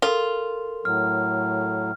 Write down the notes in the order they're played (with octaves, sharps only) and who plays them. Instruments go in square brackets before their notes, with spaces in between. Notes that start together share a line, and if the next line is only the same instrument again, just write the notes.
[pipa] F4 [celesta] A4 A#4
[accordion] A2 F#3 [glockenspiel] F6